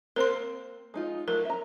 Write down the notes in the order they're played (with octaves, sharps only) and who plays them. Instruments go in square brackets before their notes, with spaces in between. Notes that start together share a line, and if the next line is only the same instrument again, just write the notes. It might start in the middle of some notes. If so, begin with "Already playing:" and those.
[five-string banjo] A#3 C4 C5 [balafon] A#4 C6
[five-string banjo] G#3 D#4 F4
[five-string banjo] F#3 A3 F4 [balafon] A#4
[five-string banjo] E5 A#5